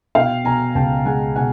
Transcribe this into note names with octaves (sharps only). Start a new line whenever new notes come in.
B2 F5 G5
B2 G#5 A#5
C#2 G5 A5
G#3 F#5 G#5
B2 F#5 G#5